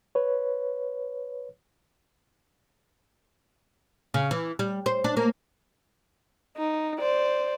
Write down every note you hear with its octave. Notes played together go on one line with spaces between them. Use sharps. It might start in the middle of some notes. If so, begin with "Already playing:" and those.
B4 C#5
C#3
E3
G3
C5
D4
A#3
D#4
C5 D5